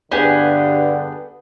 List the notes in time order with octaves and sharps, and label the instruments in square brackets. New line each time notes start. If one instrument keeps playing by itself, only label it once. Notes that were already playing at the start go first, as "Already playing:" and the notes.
[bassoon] G2 [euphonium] D3 [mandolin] B3 G4 G#4 [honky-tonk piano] B4 D5